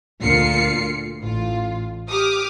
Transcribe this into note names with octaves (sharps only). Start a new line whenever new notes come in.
D2 A#2 F4 C7 C#7
A1 F4
G4 D6 D#6 F6